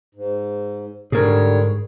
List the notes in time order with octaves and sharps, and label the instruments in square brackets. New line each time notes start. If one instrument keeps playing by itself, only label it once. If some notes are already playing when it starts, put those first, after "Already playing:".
[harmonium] G#2
[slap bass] G#2 [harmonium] D3 G3 C#5 [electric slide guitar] G#4 A#4